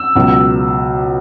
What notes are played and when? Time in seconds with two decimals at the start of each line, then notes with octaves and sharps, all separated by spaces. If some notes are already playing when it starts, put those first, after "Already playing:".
Already playing: E6
0.15 C#2 B2 F#3